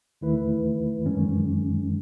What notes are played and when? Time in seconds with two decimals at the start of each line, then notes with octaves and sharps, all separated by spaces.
0.21 D#2 D#3 A3 E4 B4
1.06 F#2 D#3 G#3 C#4